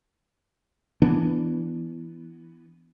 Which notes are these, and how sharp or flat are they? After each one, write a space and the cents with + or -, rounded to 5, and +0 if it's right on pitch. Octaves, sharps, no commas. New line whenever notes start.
E3 +10 B3 +0 D4 +0